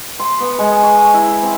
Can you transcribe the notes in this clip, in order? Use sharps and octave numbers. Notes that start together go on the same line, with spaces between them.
C6
B3
G#3
C#6
E4
C4